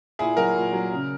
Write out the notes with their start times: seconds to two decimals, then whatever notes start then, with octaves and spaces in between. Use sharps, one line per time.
0.19 A#2 E4 G#4
0.37 F#3 F#4 A#4
0.55 A#2
0.73 F#3
0.91 C#3